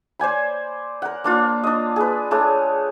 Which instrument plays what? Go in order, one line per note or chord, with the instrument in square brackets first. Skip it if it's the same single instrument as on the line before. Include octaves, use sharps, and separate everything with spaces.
[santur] C5 D5 G#5 B5
A#4 F#5
A#3 D4 F4
D4 D#5
G#4 B4
A3 D4 G#4 C#5